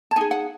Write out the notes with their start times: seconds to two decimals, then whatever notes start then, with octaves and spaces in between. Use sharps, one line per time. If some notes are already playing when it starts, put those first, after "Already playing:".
0.11 A5
0.16 D#4 G#4 G#5
0.31 F#5